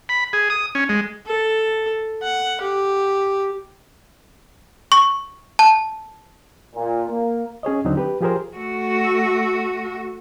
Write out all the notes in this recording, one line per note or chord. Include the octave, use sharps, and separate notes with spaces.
B5
G#4
D#6
C#4
G#3
A4
F#5
G4
C#6
A5
A#2
A#3
C#4 G#4 C#5 D#5
D#2 D3 F#3 C4 D4 D#4
G4 B4
F3 F4 G4 G#4 A#4 C5
A3 F#4